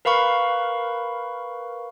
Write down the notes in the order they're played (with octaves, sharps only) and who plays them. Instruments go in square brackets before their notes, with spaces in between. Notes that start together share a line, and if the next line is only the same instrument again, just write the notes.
[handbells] A#4 B4 F5 B5 C#6